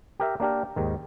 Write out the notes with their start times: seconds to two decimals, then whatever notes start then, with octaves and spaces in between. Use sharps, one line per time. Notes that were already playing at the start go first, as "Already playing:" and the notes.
0.20 G4 A#4 E5
0.40 A#3 D4 G4 A#4
0.76 D#2 G#2 D#3